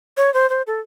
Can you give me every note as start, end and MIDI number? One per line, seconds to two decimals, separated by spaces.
0.17 0.32 73
0.34 0.49 72
0.50 0.62 72
0.67 0.80 69